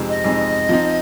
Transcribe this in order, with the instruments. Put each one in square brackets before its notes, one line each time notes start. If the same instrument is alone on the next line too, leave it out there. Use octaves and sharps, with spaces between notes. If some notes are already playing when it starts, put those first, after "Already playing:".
Already playing: [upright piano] F2 C3 G#3 C4 D#4
[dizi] D#5
[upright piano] F2 C3 G#3 C4 D#4
F3 C4 D#4